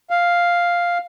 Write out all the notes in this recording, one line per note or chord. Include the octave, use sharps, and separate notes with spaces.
F5